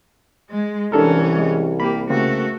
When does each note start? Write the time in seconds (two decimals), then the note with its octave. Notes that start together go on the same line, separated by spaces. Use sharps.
0.50 G#3
0.92 C2 E3 C#4 D4 A4 A#4
1.38 G#3
1.80 A#3 G4 B5
2.10 C#3 A3 A#3 C4 F#4